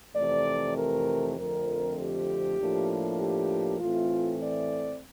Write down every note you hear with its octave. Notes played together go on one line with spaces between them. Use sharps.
F2 C3 E3 A3 D5
A#4
F2 D3 F3 A3 C4 A#4
G4
A2 F3 A#3 D4
G4
A2 E3 A3 C4 F4
D5